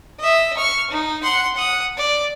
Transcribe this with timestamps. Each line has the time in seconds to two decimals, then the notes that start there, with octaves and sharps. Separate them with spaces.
0.20 D#5 E5
0.57 C#6 F6
0.90 D#4
1.23 F#5 C6
1.55 F#5 D#6
1.97 D5